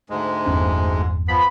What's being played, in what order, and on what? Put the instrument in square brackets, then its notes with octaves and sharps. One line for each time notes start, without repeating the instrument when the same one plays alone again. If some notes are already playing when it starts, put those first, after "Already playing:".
[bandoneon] D2 G#2 G#3
[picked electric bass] G1 E2 C#4
[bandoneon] F3 B3 [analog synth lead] B5